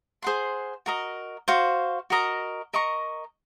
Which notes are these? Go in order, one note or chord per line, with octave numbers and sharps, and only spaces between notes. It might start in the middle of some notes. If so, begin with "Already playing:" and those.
G#4 C5 F#5 C6
F#4 A#4 D#5
F#4 C5 F5
F#4 A#4 D#5 A#5
A#4 D#5 A#5 C#6